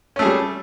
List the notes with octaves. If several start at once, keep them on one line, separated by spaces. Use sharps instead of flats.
G3 A3 C#4 G#4